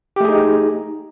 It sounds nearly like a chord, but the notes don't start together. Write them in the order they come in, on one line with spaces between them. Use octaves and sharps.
G4 A3 G#4 D#4